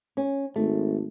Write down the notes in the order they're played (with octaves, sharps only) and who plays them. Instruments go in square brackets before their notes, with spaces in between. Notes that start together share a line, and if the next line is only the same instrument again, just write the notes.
[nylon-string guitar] C#4
[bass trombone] G#1 [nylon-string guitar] A3